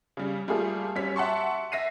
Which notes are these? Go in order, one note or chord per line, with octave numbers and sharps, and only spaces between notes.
C#3 G3
G3 A3 A#3 F4 G#4
F#2 G3 C#4 C#5 B6
E5 F#5 A5 C6 C#6
E5 A#6 C7 D#7